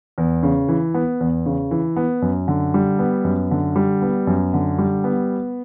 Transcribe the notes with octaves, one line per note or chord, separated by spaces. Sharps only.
E2
C#3
E3
B3
E2
C#3
E3
B3
F#2
D3
G3
B3
F#2
D3
G3
B3
F#2
D3
G3
B3